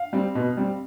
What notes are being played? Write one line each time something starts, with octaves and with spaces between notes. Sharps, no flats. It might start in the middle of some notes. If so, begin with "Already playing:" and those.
Already playing: F5
G3 C4
B2
G3 C4